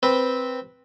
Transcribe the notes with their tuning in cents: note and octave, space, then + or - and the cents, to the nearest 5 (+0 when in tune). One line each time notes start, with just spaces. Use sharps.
C4 -5 B4 -5